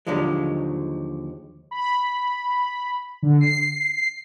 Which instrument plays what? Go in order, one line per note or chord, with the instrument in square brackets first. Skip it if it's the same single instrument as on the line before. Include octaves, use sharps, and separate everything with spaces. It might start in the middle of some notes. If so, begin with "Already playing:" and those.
[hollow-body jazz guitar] D#2 D3 F3 F#3 G#3
[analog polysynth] B5
D3
C7